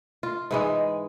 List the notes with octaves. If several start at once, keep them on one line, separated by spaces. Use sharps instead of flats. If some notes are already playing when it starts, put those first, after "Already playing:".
F4
G#2 E3 G#3